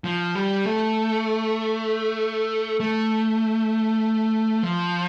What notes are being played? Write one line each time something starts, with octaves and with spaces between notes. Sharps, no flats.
F3
G3
A3
A3
F3